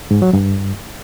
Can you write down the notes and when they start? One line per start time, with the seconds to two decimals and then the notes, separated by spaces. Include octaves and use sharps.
0.11 G#2
0.22 F#3
0.33 G2